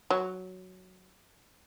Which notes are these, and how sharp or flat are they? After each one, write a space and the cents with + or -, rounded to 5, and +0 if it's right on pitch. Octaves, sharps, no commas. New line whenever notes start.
F#3 +0